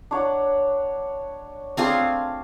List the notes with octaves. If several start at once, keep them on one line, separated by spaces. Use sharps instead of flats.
D4 C#5 F#5
A3 C4 D4 F4 G#4 A5